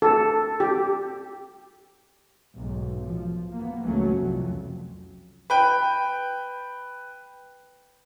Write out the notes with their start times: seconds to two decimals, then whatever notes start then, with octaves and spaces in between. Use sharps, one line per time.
0.02 A4
0.60 G4
2.54 B1 G#2
3.04 F3
3.52 A#3 B3
3.83 C#2 F#2 F#3 A3 C#4
4.18 C2 F2
5.50 B4 G5